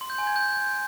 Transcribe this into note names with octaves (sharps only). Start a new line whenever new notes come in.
C6
G6
G#5
G#6
G6